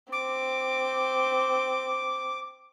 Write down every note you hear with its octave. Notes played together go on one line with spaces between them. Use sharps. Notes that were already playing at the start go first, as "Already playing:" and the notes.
C4 D6